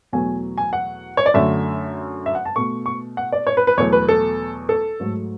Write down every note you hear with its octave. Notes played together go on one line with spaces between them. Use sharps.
E2 B2 F#3 A3 G#5
G#5
F#5
C#5
D5
F#2 D3 A3 E5
E5
F#5
A5
B2 A3 C#6
C#6
F#5
D5
C#5
B4
B4
E2 B2 F#3 A3 C#5
B4
A4
A4
G#2 F#3 A3